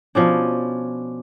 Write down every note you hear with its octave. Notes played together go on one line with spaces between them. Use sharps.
B2 F3 C#4 D4